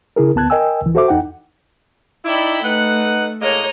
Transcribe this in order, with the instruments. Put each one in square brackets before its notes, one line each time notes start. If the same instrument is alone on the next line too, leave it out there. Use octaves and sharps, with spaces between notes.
[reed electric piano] C#3 E4 G#4 A#4
D2 B3 A5 F#6 G#6
A#4 D#5 G5 G#5 E6
C#2 E3
F#4 A4 C5 E5 D6
E2 D#4 F#5 G5
[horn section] D#4 E4 [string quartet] D5 G5 B5
[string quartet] A3 [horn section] D#4 B4 F#5
[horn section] A2 G#3 A#3 [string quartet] C#5 D#5 A#5